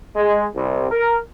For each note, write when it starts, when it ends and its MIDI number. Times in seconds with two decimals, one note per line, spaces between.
0.16 0.45 56
0.54 0.89 36
0.90 1.15 70